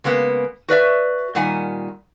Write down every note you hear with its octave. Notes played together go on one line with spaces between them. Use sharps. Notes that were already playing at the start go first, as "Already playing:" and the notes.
C#3 G#3 A#3 B3
F#4 B4 D5 E5
A#2 D#3 G3 F#5 G#5